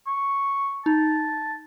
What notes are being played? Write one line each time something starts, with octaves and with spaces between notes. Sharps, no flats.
C#6
D#4 A5